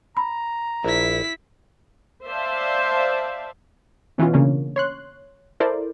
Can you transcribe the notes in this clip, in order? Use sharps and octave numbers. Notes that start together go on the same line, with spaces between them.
A#5 B5
A#1 E4 B6
C5 D5 E5 F5 A5
B2 E3 B3 C#4 F4
C#3 A#3 C#4 D4
C#5 C6 F#6
E4 A4 A#4 C5 D5